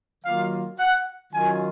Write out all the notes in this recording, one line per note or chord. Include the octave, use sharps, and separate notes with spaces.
D#3 F#3 A#3 F4 F5
F#5
D#3 F#3 C#4 F4 G#5